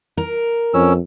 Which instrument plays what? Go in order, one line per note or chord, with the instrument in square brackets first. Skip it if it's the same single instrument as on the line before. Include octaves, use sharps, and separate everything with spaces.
[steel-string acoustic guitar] A#4
[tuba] F2 [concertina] C#4 E6